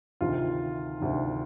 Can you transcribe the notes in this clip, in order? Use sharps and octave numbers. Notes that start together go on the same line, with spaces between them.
D2 C3 D#3 F4
D2 C3 D#3